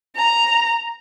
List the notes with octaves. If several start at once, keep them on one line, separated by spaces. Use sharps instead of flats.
A#5